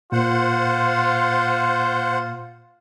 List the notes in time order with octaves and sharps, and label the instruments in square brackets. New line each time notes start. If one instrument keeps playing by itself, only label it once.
[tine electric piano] A#2 [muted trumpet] F4 [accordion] C5 F#5